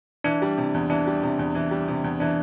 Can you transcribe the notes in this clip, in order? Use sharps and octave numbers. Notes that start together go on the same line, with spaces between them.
E3 D4
G3
C3
E2
E3 D4
G3
C3
E2
E3
G3
C3
E2
E3 D4